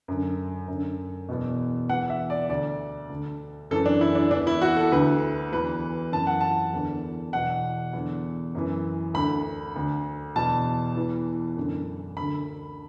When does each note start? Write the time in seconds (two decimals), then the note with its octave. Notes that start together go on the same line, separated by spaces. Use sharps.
0.08 F#2 D3
0.68 F#2 D3
1.29 E2 B2
1.89 E2 E3 F#5
2.10 E5
2.30 D5
2.50 D2 D3 D5
3.10 D2 D3
3.71 F#2 E3 A4
3.86 D4
4.01 E4
4.15 D4
4.31 E2 E3 D4
4.47 E4
4.62 F#4
4.76 A4
4.92 D2 D3 B4
5.53 E2 E3 B4
6.12 F#2 E3 A5
6.27 F#5
6.41 A5
6.73 E2 D3
7.33 E2 B2 F#5
7.93 E2 D3
8.55 F#2 E3
9.14 D2 D3 B5
9.76 D2 D3
10.36 E2 B2 A5
10.97 E2 E3
11.57 F#2 D3
12.17 D2 D3 B5